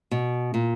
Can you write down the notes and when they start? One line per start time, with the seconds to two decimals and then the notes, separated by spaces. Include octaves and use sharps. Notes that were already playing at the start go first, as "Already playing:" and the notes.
0.11 B2
0.54 A#2